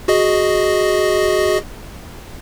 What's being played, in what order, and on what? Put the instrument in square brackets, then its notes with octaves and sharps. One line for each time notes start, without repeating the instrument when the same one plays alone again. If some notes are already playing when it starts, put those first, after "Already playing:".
[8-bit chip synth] F#4 G#4 D#5